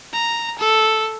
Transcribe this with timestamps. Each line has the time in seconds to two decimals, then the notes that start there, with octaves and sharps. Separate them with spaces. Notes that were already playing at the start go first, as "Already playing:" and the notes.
0.13 A#5
0.59 A4